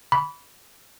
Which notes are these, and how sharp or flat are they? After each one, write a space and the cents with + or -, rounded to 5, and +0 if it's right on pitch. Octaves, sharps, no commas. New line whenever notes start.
B5 +0 D6 -45